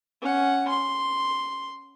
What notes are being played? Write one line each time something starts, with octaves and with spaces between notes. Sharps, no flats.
C#4 F#5
C6